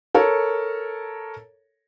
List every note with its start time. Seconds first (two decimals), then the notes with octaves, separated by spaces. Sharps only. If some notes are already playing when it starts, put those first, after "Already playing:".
0.14 A4 A#4 C#5